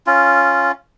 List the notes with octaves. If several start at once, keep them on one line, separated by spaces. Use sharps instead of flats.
C#4 F4